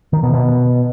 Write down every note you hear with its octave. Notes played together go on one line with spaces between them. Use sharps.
D#3
B2
B2